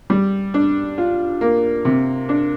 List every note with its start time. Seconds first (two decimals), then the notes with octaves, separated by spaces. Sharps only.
0.10 G3
0.54 D4
0.98 F4
1.41 A#3
1.85 C3
2.29 D4